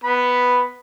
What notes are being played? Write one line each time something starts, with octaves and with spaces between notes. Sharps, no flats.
B3 B5